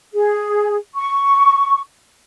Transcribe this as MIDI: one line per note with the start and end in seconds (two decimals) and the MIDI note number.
0.14 0.76 68
0.96 1.80 85